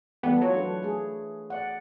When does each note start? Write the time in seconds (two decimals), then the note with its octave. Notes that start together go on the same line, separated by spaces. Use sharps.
0.23 E3 G3 A3 B3 A4
0.42 F#3 F4 C#5
0.54 D4 A4 B4
0.83 A3 G#4
1.50 D5 F#5